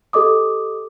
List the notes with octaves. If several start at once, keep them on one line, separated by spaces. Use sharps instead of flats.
G4 A4 D#5 D6 D#6